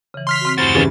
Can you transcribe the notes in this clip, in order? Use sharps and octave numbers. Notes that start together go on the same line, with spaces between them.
C#3 E3
C6 F6 B6
C4 F#4
E2 G2 F#4 C5 F6 A6
C#3 E3 G3